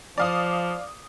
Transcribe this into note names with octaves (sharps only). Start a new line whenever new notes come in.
F3 D5 F5 D#6